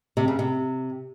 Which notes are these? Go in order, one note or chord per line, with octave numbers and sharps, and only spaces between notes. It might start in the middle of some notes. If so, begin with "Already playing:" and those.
C3
C#3
C3